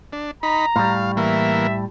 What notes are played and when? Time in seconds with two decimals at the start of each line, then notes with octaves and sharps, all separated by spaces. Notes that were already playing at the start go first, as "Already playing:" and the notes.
0.13 D4
0.43 D#4 A#5 B5
0.76 A2 G3 F5
1.17 E3 A#3 E5